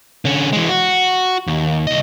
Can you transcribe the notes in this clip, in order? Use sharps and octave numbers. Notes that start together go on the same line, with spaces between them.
D3 C#4
E3 G#3
F#4
D#2
C2 D#5